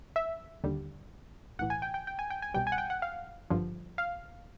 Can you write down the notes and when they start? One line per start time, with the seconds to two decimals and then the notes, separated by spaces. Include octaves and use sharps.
0.16 E5
0.64 D#2 D3 G3
1.59 B1 A2 E3 F#5
1.70 G#5
1.82 G5
1.94 G5
2.07 G5
2.19 G#5
2.30 G5
2.42 G#5
2.54 C2 B2 G3 G5
2.67 G#5
2.72 F#5
2.78 G5
2.90 F#5
3.02 F5
3.50 G#1 G2 D3 F3
3.98 F5